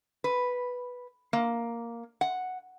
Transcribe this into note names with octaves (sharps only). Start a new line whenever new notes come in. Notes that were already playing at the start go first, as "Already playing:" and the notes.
B4
A#3
F#5